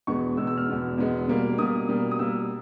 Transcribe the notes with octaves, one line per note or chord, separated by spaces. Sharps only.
E2 B2 G#3 B3 C#6
E2 B2 G#3 B3 E6
E6
F6
E2 B2 G#3 B3
E2 B2 G#3 B3
B2 G3 A#3
B2 G3 A#3 D#6
B2 G3 A#3
D#6
B2 G3 A#3 E6